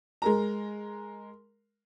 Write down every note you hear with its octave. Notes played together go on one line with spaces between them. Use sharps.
G#3 A#4 A#5